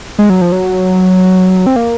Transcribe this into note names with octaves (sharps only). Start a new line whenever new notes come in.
G#3
F#3
F3
F#3
C4
A#3